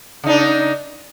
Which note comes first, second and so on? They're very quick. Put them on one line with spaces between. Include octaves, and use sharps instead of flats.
C#3 D#4 D4